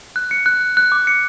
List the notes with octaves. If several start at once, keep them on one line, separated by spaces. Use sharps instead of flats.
F#6
C#7
F#6
F#6
F#6
D6
C#7